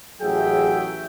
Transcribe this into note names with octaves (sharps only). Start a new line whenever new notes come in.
A1 F#3 G#4 E5 G5